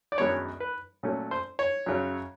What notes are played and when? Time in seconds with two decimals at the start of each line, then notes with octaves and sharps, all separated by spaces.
0.12 D5
0.18 F#2 D#3 G#3 B3 D4 C#5
0.60 B4
1.03 A#2 F#3 A3 C#4
1.31 C5
1.59 C#5
1.86 F#2 C#3 F#3